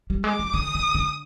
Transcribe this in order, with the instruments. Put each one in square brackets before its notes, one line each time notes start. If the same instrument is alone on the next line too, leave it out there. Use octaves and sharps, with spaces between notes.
[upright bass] G3
[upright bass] G#3 [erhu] D6
[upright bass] G3
[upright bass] D3 [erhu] D#6
[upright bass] D3
D3